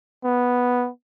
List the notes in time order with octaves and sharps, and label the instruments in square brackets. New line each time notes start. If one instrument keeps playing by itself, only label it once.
[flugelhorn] B3